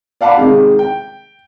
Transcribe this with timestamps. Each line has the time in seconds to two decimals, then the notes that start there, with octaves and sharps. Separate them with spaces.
0.21 D5 F5 F#5 A5 B5 D6
0.37 C3 D#3 G#3
0.79 G5